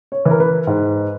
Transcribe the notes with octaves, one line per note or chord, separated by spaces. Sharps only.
C#5
E3
A#4
B4
G#2